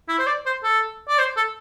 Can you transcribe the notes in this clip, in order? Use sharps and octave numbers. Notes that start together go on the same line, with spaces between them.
E4
C5
D5
C5
A4
D5
C5
A4